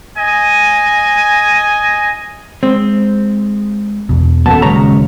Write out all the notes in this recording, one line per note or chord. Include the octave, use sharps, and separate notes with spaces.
D#5 G#5
G#3 C4
E2 B2
D#1 F#2 A#3 B3 A4 A5
C#3 G#3 C#5 A#5